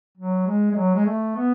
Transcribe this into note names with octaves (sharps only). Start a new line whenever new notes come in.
F#3
G#3
G#3
F#3
G#3
A3
B3